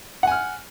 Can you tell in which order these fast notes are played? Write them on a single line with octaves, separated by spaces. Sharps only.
F#5 G#5 F6